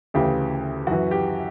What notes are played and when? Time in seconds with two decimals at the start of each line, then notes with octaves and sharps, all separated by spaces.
0.14 D2 C#3 E3 G4
0.87 F#2 E3 F#4
1.11 G4